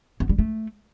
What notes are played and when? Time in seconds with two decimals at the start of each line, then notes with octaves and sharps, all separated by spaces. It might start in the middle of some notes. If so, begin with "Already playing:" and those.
0.20 B3
0.29 G3
0.39 A3